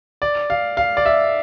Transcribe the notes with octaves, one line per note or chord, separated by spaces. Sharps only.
D5
F5
F5
D5
E5